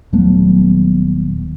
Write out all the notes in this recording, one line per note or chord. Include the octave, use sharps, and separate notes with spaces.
D#1 F#3 A3 B3